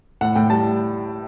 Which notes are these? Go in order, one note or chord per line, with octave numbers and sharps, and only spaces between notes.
A2 F#5
A2 G5
G3 A5